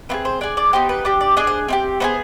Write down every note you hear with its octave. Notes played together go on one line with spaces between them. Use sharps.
C4 F4 G#4 B4
C5
D4 G#4 D5
D5
B3 D#4 G4 C5
B4
D4 G4
D5
D4 G#4 D#5
C5
C4 D#4 G4
B3 D#4 G#4 C5